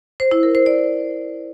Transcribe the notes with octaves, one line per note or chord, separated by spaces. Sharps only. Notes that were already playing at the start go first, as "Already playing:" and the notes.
C5
E4
A#4
C5
D5